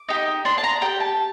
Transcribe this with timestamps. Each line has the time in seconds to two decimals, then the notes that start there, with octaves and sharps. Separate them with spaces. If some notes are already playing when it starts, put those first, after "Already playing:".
Already playing: D6
0.09 D#4 G4
0.45 D4 C6
0.58 A5
0.63 A#5
0.82 G4 G5
1.00 A5